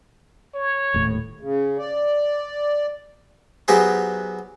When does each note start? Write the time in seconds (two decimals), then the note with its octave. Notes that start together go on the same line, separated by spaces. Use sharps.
0.55 C#5
0.94 D#1 A2
1.41 C#3
1.79 D5
3.68 F#3 B3 D#4 G4 G#4 C5